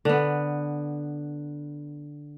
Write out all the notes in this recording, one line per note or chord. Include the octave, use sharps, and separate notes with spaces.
D3 B3